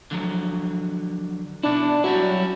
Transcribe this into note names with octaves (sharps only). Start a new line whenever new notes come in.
D3 F3 F#3
B2 D4 E4
F#3 G3 C#4 E4